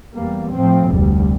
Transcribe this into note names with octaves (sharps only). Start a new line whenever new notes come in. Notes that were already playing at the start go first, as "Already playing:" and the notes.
E2 G3 A#3
A2 F3 C4
F1 D2 G3